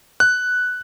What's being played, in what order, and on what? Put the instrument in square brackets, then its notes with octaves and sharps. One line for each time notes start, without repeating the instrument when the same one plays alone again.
[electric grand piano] F#6